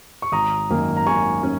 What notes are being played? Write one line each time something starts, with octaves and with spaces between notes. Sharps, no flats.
C#6
G#1 A#5 D#6
F#2 D#3 A#3 C#4
A#5
G#1 G#5 C#6
C#4